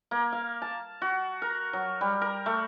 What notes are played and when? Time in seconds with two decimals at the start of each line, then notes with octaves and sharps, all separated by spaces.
0.11 A#3
0.32 F5
0.62 A5
1.02 F#4
1.42 A#4
1.73 F#3
2.01 G3
2.22 A#4
2.46 A3